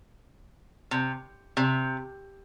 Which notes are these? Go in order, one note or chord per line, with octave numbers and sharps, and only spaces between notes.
C3
C3